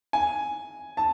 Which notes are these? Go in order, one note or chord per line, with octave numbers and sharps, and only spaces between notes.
G#5
A5